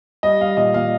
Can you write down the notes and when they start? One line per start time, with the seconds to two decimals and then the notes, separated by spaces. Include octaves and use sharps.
0.23 G3 D#5
0.41 G3 F5
0.57 A#2 D#5
0.74 A#2 F5